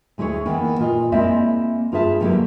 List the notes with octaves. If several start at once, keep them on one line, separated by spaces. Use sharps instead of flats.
D2 G#3 E4 G#4 C#5
D#3 E3 A#3 B3 E4
A#2 F4 D#5
G#3 A#3 C4 E4 D5 E5
G2 F4 G#4 B4 E5 A5
B2 D3 F#3 G3 A#3 E4